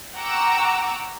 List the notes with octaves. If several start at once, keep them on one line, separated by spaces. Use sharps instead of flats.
F#5 G5 A#5 C#6 D6 E6